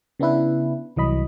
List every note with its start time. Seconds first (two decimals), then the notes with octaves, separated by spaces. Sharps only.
0.19 C#3 B3 D4 E4 B4
0.96 C2 E3 F#3 D#5 B5